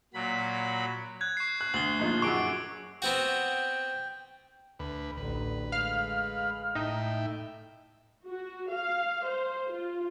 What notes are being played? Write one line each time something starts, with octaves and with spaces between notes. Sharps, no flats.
A#2 F#3 B5
F#6 G#6
C#6 C7
F#6
D2 F#7 G7
A#1 D#4 F4
F#2 G#4 C#6 D6 D7
B3 C4 F#4 G5
D2 B4
A1 D2 B4
G#3 F5 F6
A2 D#4 E5 G5
F#4
F5
C5
F4